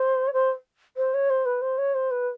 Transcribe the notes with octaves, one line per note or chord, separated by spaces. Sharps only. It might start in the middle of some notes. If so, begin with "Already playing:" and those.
Already playing: C5
C#5
C5
C5
C#5
C5
B4
C5
C#5
C5
B4